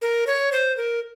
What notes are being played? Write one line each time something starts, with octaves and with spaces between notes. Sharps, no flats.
A#4
C#5
C5
A#4